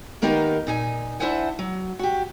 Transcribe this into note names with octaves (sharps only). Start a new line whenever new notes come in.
D#3 A#3 B3 D#4 G4 A#4
A#2 D#4 G#5
D4 E4 C5 E5 F#5 G#5
F#3
F#4 G4